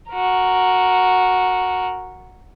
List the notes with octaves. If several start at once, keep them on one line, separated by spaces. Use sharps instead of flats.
F#4 A#4